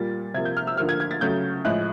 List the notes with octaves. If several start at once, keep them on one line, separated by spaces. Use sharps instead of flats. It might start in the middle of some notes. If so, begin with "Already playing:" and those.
Already playing: A#2 G3 A#3 A6
C3 F3 A#3 G#6
G6
F6
E6
D3 F3 A#3 F6
G#6
G#6
A6
C#3 F#3 A3 G6
A2 F3 G#3 F#6